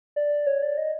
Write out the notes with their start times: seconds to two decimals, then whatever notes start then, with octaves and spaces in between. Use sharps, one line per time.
0.16 D5
0.47 C#5
0.62 D5
0.78 D#5